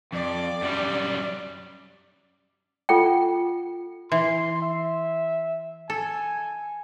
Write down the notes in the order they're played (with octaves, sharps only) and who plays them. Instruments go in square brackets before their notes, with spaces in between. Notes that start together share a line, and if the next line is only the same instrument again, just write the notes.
[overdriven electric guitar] F2 [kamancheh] D5
[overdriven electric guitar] F#2 G3
[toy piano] F4 A4 F#5 G5
[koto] E3 [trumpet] C6
[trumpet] E5
[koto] A4 [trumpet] G#5